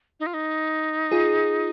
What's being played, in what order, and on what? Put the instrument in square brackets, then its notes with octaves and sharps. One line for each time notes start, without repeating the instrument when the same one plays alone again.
[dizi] D#4
F4
D#4
[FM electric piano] F4 G#4